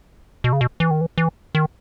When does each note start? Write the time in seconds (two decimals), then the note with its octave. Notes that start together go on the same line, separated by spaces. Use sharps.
0.44 B2
0.53 C#3
0.61 B2
0.80 E3
0.91 D#3
1.01 E3
1.18 E3
1.55 D#3